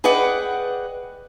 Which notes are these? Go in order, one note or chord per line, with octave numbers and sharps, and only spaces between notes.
G#4 B4 D5 D#5 F#5 G5